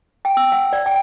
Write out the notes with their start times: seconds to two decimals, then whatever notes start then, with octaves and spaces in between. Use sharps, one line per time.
0.25 G5
0.37 E6
0.52 F#5
0.73 D5
0.86 G5